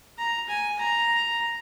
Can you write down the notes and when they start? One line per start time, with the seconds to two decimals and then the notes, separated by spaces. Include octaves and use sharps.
0.18 A#5
0.49 G#5
0.79 A#5